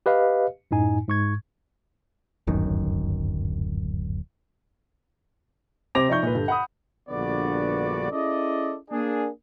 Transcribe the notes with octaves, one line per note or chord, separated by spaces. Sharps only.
G4 B4 D#5 F5
F#2 A2 D#4 G#5
G#2 C#6 G#6
D1 G1 F#2 D#3
C3 C5 D6 A#6 F7
F3 D#4 D5 E5 C#6 G6
A#2 B4
G2 D3
F#5 B5 D#6
A#1 G2 D3 B3 F#4 D5
C#4 E4 G#4 A4 D5 D#5
A#3 D4 G#4